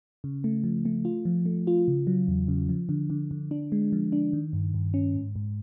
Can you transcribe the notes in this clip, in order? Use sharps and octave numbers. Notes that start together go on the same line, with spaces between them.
C#3
A3
F3
A3
F4
F3
A3
F4
C#3
F#3
E2
C#3
F3
D3
D3
D3
D4
G#3
F3
D4
D#3
G2
G2
C#4
G#2
G#2